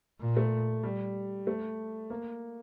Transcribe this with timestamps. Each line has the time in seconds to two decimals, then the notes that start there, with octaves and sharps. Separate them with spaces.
0.20 A#2
0.37 A3
0.83 G3
1.47 A3
2.10 A#3